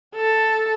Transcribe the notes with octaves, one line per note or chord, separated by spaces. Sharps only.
A4